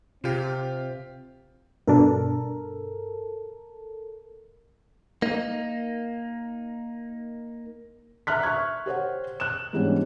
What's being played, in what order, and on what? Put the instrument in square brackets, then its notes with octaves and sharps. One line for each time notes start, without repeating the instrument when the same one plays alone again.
[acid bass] C3 [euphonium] C4 [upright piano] F4 G4
[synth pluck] G2 B2 D4 [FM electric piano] A4 A#4
[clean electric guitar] A#3 D#4
[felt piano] E5 A#5 F6 F#6 B6
E5 C#6 F#6 G#6
G4 C5 C#5 F#5
F#6 E7
G#2 E3 G3 B3 C#4 D4